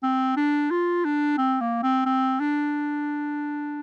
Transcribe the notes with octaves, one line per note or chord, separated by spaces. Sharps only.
C4
D4
F4
D4
C4
A#3
C4
C4
D4